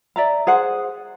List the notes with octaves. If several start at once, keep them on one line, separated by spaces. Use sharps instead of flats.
D5 E5 A#5
G#4 C5 F#5